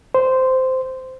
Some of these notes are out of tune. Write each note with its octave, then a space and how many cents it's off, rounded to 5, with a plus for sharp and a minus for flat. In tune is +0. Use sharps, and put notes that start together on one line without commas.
C5 -10